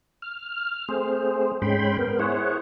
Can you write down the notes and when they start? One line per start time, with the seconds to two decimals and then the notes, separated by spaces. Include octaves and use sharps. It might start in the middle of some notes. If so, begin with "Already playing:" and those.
0.22 F6
0.89 A3 C4 G#4 C5
1.62 G#2 G#3 C#4 G5 B5 C6
1.99 B3 A#4
2.19 E4 G#4 C5 C#5 F#5